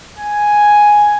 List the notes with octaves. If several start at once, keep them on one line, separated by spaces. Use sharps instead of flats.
G#5